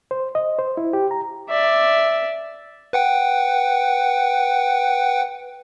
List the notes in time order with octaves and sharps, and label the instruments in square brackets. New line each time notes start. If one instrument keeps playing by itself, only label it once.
[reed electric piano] C5
D#5
C5
E4
G4
A#5
[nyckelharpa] D5 E5
[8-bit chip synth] B4 F#5 G5